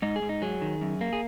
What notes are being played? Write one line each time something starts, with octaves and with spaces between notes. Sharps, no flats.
G#2 D#4
G#4
G#2
D#4
F#3 G#4
D#3
F#2
A#3
G#4